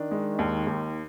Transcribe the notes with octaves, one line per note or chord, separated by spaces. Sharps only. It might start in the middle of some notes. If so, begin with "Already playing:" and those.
Already playing: D#3 D4
G#3
D#2
D#2